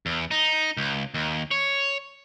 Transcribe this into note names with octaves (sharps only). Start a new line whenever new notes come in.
E2
D#4
C#2
D#2
C#5